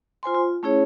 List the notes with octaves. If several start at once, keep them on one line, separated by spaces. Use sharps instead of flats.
F4 C5 G#5 C6
F4
A3 C#4 E4 G#4 C#5